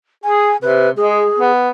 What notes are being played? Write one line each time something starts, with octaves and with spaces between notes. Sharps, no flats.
G#4 G#5
C3 B4
G#3 G#4
B3